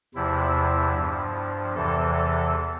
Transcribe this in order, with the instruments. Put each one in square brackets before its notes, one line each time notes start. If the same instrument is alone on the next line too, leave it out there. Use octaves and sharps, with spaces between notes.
[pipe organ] E2 C3 F3 E4
G2 F3
E2 C3 E3 A4
A4